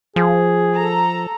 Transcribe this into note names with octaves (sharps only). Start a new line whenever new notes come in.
F3 G#4
A4 A#5